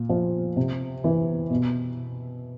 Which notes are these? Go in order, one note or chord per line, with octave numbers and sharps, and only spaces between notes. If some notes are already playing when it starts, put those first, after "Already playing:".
Already playing: A#2
F3
C3
E3
B2